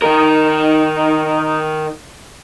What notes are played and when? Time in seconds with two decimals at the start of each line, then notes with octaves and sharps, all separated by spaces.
0.02 D#3 A#4